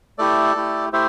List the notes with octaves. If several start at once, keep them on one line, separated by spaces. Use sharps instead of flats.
A3 E4 G4 A4 D5
A3 E4 G4
A3 E4 G4 C5 E5